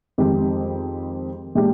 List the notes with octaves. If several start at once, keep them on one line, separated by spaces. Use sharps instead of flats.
F2 D#3 G#3 C4 G4
A#2 G#3 D4 G4